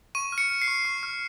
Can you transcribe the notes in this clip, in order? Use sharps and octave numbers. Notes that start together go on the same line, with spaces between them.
C#6 D#7
F6
C#7
F6
C7
C#6
C#6
F6